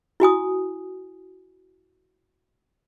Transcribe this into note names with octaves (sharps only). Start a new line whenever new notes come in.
E4 F#4 G#5 D#6